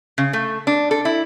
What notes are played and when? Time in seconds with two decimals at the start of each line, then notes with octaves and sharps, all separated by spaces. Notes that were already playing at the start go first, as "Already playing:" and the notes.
0.18 C#3
0.33 A3
0.67 D4
0.91 A4
1.05 E4